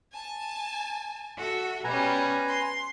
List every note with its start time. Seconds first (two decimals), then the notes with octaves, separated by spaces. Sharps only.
0.12 G#5 A5
1.37 F#4 A4 E5
1.84 B2 G3 C#4 B4 G#5 A#5
2.47 C6